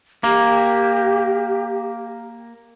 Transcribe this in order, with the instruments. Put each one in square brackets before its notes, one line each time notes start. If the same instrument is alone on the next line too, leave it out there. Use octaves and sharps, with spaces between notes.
[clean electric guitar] A#3 [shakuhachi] G4